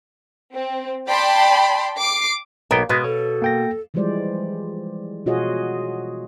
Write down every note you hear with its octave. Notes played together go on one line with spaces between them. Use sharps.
C4
D5 G5 A5 B5 C6
D6 C7
B1 A#3 B3 G5
B2 G#3 B3 D#5
A4 C#5
A#3 G5 A#6
E3 F3 G3 G#3 C5 D5
B2 F4 F#4 G#4 C#5 D#5